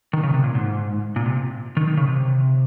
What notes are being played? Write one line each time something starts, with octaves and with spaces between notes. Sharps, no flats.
D#3
C#3
C3
A#2
G#2
A#2
C3
D#3
D#3
C#3
C3